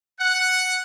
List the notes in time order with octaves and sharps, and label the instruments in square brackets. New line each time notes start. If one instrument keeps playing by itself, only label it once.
[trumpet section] F#5